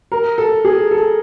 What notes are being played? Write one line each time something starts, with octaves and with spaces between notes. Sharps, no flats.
A#4
A4
G#4
A4